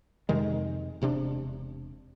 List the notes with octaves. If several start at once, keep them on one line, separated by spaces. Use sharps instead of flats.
F2 C3 D#3 G#3
E1 C3 C4 D4